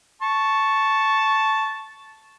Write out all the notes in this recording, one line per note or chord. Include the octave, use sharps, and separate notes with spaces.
A5 C#6